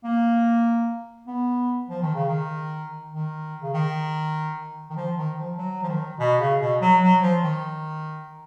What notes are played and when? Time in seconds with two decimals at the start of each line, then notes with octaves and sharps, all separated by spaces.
0.04 A#3
1.27 B3
1.89 F3
2.02 D#3
2.15 C#3
2.28 D#3
3.12 D#3
3.63 C#3
3.74 D#3
4.90 D#3
4.96 F3
5.17 D#3
5.38 F3
5.58 F#3
5.83 F3
5.89 D#3
6.20 B2
6.40 C#3
6.61 B2
6.81 F#3
7.02 F#3
7.22 F3
7.43 D#3